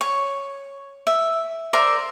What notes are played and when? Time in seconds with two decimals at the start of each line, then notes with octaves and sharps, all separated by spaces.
0.01 C#5
1.07 E5
1.73 A#4 C5 D5 E5